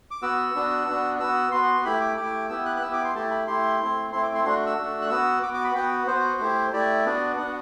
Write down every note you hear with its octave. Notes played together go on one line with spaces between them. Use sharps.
D6
B3 F#4 E6
B3 D4 F#4
B3 D4 F#4
B3 F#4 E6
B3 F#4 C6
A3 E4 G4 B5
D6
A3 E4 G4 D6
B3 E4 G4 E6
F#6
F#6
B3 E4 G4 E6
D6
C6
A3 E4 G4 A5
B5
A3 E4 G4 C6
A3 C4 E4
A3 C4 E4 C6
D6
C6
A3 D4 F#4 C6
E6
A3 D4 F#4
F#6
B3 F#4 E6
B3 F#4 D6
D6
B5
B3 F#4 G5
B3 F#4 C5
A3 E4 G4
A3 E4 G4 D5
B3 D4 F#4
B3 D4 F#4 F#5